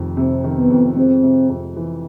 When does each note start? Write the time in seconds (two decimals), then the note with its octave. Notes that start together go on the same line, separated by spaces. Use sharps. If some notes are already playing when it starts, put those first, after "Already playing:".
Already playing: F1 F2 D#3
0.17 C3 C4
0.44 D#3
0.57 B3
0.70 F2
0.96 G#3 C4
1.23 C3
1.49 F2
1.76 E3